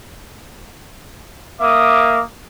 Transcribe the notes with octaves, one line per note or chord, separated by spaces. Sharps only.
A#3 E5 D6 D#6